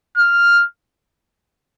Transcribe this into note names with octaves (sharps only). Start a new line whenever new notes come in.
F6